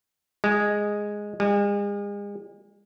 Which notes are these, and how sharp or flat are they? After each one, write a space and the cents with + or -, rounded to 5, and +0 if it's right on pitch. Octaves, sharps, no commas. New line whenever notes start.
G#3 -5
G#3 -40